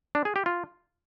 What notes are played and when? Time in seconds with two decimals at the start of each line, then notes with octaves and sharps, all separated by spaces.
0.15 D4
0.25 G#4
0.36 G4
0.46 F4